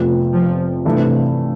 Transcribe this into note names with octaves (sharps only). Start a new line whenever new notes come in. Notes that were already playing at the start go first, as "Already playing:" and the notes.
Already playing: F1 F2 C3 F3 B3
F3
G2 C3 E3 A3